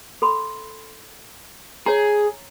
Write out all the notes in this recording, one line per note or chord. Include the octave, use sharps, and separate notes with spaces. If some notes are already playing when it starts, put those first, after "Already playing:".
A4 B5 C6
G#4 C#5 A#5